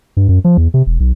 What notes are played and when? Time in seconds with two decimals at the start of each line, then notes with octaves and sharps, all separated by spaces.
0.17 G2
0.29 F#2
0.44 F3
0.57 E2
0.74 C3
0.86 E1
1.00 B1